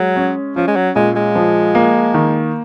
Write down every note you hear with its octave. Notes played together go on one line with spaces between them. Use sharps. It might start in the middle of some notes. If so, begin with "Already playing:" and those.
Already playing: F#3 G#3
C#4
F3 C#4
G#3
F#3
A#2 G#3
G#3
F3
A#3
D#3